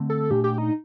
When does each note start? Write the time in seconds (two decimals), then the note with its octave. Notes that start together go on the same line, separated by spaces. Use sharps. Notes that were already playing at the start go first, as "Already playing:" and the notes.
Already playing: D3 A3 C4
0.09 A4
0.31 A#2 A3 D4 G4
0.44 G4
0.58 D#4